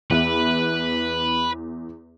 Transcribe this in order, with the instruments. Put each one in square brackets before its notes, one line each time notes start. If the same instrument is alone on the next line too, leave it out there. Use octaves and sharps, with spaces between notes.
[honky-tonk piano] E2 E5 [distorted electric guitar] B4